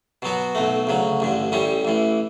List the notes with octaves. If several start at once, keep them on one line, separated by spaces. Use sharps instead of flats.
B2 F#3 B3 F#4
B1 B2 A3
D2 C#3 F#3
A1 G2 D3
A1 A2 G3 C#4
A1 A2 E3